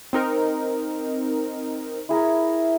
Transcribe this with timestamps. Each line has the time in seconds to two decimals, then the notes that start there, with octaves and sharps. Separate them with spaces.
0.13 C4 D#4 A#4
2.09 E4 G#4 A#4